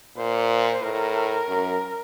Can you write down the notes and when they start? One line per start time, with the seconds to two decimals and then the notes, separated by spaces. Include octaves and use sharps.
0.17 A#2 C5
0.82 A2 A#4
1.48 F#2